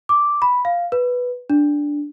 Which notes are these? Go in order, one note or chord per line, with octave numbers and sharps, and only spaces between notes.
D6
B5
F5
B4
D4